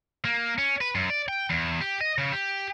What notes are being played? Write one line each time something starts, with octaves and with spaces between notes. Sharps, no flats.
A#3
C#4
B4
F#2
D5
G5
E2
G4
D#5
C#3
G4